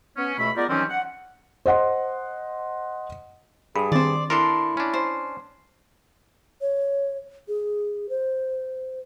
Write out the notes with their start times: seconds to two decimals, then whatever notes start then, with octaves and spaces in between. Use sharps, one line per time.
0.17 B3 C#4
0.38 C#2 B2 A3 E5 B5
0.56 G#3 B3 F4 G4 A#4 D5
0.69 D#3 E3 F#3 G3 C4 C#4
0.90 F#5
1.66 C5 D#5 F#5 C6
3.76 G2 G#4 B5 D#6
3.92 D#3 C4 C5 D5
4.30 D4 E4 A4 A#4 C6
4.77 C#4 D4
4.94 C5
6.61 C#5
7.48 G#4
8.09 C5